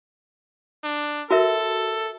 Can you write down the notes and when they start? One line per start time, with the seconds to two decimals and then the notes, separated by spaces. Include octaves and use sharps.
0.84 D4
1.31 F#4 A4 A#4 E5